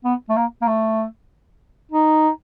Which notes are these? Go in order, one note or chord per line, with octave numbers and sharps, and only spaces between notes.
B3
A3
A#3
A#3
A3
D#4